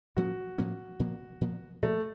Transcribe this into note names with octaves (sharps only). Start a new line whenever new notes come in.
A2 F3 A#3 C#4 F#4
A2 F3 A#3 C#4
A#2 F3 A#3
A#2 F3 A#3
A#2 F3 A3 A#3